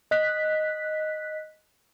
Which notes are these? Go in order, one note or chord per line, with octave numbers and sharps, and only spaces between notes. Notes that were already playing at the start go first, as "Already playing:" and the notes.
D#5 F#6 B6